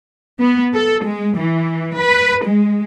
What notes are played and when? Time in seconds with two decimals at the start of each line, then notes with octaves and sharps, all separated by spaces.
0.40 B3
0.74 A4
1.04 G#3
1.38 E3
1.99 B4
2.44 G#3